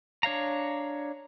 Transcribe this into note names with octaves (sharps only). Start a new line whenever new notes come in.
D4 C#5 F5 A#5